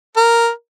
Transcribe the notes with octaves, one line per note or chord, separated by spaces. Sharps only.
A#4